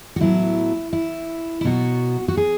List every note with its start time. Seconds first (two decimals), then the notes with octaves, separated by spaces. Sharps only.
0.16 F#4
0.21 A2 F#3 B3 E4
0.93 E4
1.61 E4
1.65 B2 F#3 B3 F#4
2.28 F#4
2.37 G#4